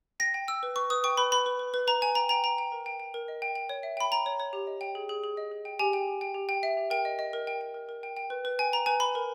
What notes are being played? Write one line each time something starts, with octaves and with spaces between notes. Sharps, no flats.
G5 A#6
G5
G5 E6
B4
B4 C#6
B4 D#6
G5 C#6
B4 B5
B4 B5
B4
B4
B4
B4 A#5
B4 G#5
G5 A#5
G5 A#5
G5 A#5
G5
A#4
G5
G5
A#4
D#5
G5
G5
C#5
E5
G5 B5
G5 A#5
C#5
C#5
G4
D#5
G5
G#4
G#4
G#4
D#5
G#4
G5
G4 G#5
G5
G4
G5
G4
G5
E5
G4
A#4 G5
D#5
D#5
A#4
G5
G5
A#4
A#4
G5
G5
B4
B4
G5 G#5
G5 A#5
B4 G#5
B4 B5
A#4